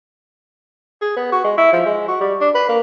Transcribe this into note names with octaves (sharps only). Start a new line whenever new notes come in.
G#4
B3
F#4
G#3
E4
F3
G#3
F#4
G3
D4
B4
A#3